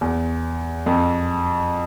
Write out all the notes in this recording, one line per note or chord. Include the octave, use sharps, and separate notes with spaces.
E2
F2